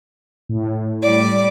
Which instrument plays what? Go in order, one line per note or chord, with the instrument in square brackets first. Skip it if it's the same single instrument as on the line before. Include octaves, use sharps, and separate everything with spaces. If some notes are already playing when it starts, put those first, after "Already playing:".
[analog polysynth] A2
[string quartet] G3 D5